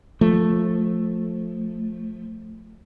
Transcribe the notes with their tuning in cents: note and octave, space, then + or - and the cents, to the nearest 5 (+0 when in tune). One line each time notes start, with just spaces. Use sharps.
F3 +15 A3 +0